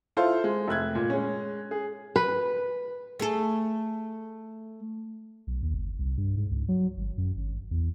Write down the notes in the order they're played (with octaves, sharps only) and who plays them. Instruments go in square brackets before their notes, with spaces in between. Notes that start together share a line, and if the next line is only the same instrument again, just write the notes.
[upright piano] E4 F4 A4 C5 F5 C6
G#3
F1 E5 F#6 G#6
A#2
G#3 C#4
G#4
[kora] B4
[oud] A3 G#4 A4
[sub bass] B1
D#2
F#1
C2
G2
G#2
C#2
F#3
G#1
F#2
G#1
E2